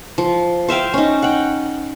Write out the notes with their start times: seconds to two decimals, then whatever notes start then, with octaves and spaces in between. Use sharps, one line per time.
0.18 F3
0.68 C5 E5 F5 G5
0.94 C#4 D#4
1.22 F#5 G5